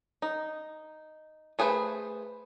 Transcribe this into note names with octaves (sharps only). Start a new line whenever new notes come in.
D#4
A3 G#4 B4 C5